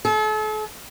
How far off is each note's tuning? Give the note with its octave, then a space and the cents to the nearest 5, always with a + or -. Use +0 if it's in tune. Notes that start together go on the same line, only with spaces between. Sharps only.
A4 -40